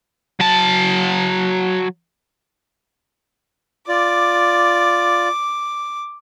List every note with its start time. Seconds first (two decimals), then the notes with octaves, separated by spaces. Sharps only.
0.40 F#3 A5
3.89 F4 D5 D6